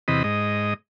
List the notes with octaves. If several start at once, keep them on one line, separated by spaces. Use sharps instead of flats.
E2 C3 D#5 B5
G#2 D#5